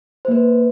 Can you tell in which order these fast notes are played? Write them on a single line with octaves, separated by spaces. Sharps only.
C5 A#3 B4